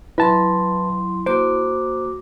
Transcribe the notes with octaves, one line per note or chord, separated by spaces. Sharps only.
F#3 E4 B4 A5 C6
A#3 F#4 C5 D6